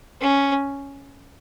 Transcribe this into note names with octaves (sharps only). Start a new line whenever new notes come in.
C#4